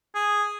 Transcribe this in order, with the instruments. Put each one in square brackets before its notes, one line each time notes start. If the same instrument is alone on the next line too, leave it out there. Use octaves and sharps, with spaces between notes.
[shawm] G#4